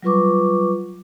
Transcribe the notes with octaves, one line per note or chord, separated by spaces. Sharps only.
F#3 G3 F4 B4 C#6 D6